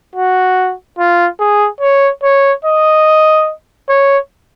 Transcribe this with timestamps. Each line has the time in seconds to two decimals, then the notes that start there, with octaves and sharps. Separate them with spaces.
0.16 F#4
0.98 F4
1.40 G#4
1.81 C#5
2.23 C#5
2.65 D#5
3.89 C#5